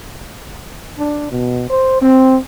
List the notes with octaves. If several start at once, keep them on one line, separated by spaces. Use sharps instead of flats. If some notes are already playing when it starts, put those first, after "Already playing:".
D4
B2
C5
C4